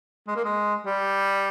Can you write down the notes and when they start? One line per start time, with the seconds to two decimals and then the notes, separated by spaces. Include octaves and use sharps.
0.28 G#3
0.36 A#3
0.44 G#3
0.86 G3